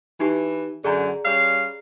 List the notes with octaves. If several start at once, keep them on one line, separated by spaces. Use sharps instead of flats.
E3 D#4 G4
F#2 D3 G#4 D5 A#5
G3 C#4 F5